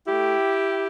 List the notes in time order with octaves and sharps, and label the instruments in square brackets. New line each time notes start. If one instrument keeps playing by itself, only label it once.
[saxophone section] A3 E4 G4